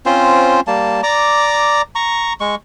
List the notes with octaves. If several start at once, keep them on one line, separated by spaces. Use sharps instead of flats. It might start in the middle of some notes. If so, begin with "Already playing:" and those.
C4 C#4 F4 C5
G3 A#3 A5
D5 A#5 D6
A#5 C#6
G#3 C#6